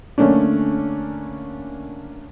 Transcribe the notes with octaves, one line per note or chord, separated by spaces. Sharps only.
D3 A3 A#3 C#4 D4